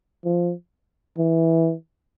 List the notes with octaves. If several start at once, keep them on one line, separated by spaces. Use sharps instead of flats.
F3
E3